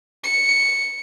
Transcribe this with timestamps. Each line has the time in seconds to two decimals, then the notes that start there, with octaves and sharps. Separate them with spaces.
0.24 C#7